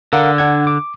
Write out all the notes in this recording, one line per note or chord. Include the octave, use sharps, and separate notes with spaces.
D3 A#4 F5 F#5
D4 F#5 G#6
D6